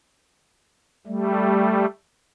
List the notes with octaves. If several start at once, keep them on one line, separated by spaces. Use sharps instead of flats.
G3 A3